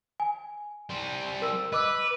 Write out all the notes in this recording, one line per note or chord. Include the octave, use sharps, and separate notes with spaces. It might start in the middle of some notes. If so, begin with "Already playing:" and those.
G#5
G3 C5
A#4 E6
B4 D#5 D6 E6